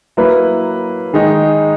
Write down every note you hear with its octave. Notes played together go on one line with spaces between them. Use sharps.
F#3 A#3 E4 B4
D#3 G#3 D#4